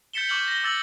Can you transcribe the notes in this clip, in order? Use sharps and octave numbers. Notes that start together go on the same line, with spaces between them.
G6 A6 B6 C#7 E7 G7
C#6 D6 F6 G6 F#7
A#6 G7
D6 E6 A6 F#7